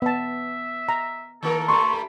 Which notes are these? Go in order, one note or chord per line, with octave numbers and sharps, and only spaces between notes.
B3 E5 A5
A#5
D#3 A#3 A4 A#4
G2 G3 A3 C6 C#6
B5